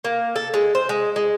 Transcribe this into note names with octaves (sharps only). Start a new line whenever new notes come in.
A#3
A4
G#3
C5
G#3
G#3